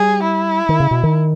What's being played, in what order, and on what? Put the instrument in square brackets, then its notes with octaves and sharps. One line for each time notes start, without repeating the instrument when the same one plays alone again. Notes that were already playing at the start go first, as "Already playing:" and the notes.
Already playing: [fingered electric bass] G3 [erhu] G#4
[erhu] E4
[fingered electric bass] D#3
C#3
B2
D#3